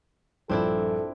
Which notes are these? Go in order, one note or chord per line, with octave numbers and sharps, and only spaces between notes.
A#1 G2 C4 D4 E4 A4